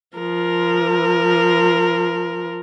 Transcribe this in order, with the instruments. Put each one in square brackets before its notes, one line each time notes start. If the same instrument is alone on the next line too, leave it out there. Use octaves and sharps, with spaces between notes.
[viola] F3 A#4